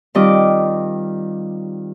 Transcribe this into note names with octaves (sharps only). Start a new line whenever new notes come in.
D#3 G3 C4 F4 D#5 D6